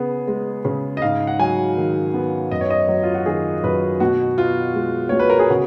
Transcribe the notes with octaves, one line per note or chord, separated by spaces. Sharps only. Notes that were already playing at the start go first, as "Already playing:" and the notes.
Already playing: C#3 B3 G#4
G#3
C#3
D#5
G#2 F5
F#5
F#3 G#5
D#3
B3
F#2 D#5
C#5
D#5
F#3
F4
F#4
D#3 G#4
F#2 B4
B2 F#4
B3 F4
G#3
B2 C#5
B4
A#4
G#4
C#3 F#4